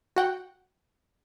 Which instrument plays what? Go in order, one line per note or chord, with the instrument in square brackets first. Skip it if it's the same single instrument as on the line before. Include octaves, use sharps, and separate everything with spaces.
[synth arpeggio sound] F#4 F#5 G5